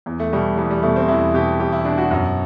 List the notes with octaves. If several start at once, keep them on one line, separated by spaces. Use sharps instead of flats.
E2
A3
B2 G3
E2 G3
G3
B2 A3
C4
E2 E4
B2 G4
E2 G4
E4
B2 D4
F#4
F#2